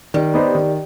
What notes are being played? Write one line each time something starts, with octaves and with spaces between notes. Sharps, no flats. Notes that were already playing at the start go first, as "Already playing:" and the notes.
D#3 G3
B3 D#4 G4 C5
D#3